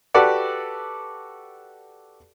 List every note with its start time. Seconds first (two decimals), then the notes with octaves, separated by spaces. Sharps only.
0.14 F#4 G4 A4 B4 D5 F#5